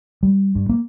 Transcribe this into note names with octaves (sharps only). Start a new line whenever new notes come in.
G3
G2
A#3